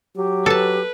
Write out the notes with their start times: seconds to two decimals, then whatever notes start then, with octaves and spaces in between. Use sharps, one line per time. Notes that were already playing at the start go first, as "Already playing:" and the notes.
0.16 F#3 G4
0.46 A4 B4 A5